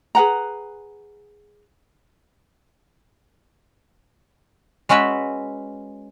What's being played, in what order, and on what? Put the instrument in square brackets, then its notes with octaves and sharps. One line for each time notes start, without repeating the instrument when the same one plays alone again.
[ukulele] G#4 B4 F#5 A#5
[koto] G#3 C#4 F#4 B4 E5